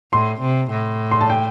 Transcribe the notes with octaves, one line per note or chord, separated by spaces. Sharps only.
A2 C6
C3
A2
C6
A5
G5